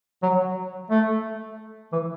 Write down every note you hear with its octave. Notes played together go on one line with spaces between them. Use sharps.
F#3
A3
E3